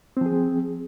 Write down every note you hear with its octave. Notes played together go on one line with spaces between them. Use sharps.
F3 C4 G#4